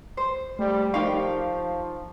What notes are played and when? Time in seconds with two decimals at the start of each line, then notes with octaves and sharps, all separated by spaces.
0.17 C5
0.59 G3 A3
0.94 F3 D#4 G4 A#4 F5 C#6